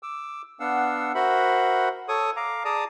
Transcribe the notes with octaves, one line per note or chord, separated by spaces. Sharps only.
D6 E6
B3 D4 F5 F#5 E6
F#4 A#4 C5 E5 F#5 B5
A4 C#5 C#6 D#6
F5 A#5 D6
G#4 D5 A5 A#5 D6 D#6